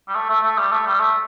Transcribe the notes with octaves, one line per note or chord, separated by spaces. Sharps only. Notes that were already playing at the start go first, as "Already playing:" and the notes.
G3
A3
A3
A3
G3
A3
G3
A3